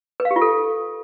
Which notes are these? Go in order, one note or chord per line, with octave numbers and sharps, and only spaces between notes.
B4
F5
G4
F4
A4